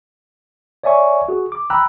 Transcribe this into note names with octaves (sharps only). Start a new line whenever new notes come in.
C#5 D5 E5 G#5 C#6
F#4 G#4
D6
G5 A#5 B5 E6 F#6